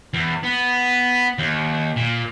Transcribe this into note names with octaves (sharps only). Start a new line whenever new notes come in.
E2
B3
D#2
A#2